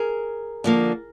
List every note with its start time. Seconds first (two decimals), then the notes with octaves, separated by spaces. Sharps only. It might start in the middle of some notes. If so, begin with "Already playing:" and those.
Already playing: G#4 A#4
0.64 D3 F3 A#3